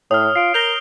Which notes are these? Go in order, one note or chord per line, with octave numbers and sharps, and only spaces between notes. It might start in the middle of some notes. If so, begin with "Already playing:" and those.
A2 C#5 D#6 F6
F4 C7 D7
A#4 G6 A#6 F7 G7